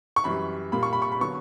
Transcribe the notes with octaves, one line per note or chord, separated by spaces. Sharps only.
C#6
F#2 E3 G3 B5
A#2 G3 A#3 B5
C#6
B5
C#6
B5
D3 F#3 B3 C#6